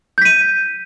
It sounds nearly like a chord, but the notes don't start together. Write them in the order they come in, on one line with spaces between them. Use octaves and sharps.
G6 B6 D#7